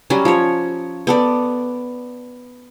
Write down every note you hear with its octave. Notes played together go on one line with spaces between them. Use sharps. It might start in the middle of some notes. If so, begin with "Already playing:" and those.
F#3 G3 C#4
F3 C#5
B3 A4 D5